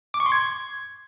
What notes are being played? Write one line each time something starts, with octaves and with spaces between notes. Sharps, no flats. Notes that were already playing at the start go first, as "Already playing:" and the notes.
D6
C#6
C6
G#6